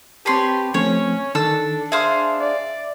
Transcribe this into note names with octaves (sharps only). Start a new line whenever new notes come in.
C4 G4 B4 C#5 A5 C6
F3 A3 C4 C#4 C#5
D#3 D4 A4 A5 E6
G#4 C5 E5 F5
D5